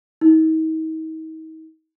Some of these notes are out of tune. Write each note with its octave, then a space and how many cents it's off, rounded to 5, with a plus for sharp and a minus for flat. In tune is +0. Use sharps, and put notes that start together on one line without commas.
D#4 +40